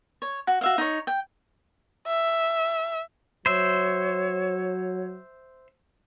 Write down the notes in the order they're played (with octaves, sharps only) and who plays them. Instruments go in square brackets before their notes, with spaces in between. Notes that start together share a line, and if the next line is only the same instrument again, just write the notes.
[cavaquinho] C#5
F#4
F#4 E5 F5
D#4 C#5
G5
[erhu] E5
[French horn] F#3 [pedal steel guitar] C5 E5 [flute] C#5